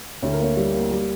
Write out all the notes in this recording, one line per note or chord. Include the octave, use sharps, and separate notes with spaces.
D2 C#5
A#4
A#3 C#5
G3
A#3
G3